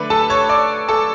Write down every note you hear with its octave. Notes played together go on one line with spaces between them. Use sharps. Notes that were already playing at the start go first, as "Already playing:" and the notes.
Already playing: D3 A3 D4 B4 B5
A4 A5
C#5 C#6
D5 D6
A4 A5